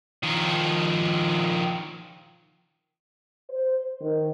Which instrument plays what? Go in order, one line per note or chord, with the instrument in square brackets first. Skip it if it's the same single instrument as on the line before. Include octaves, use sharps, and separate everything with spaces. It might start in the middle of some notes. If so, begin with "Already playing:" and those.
[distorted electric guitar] D#3 F3
[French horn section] C5
D#3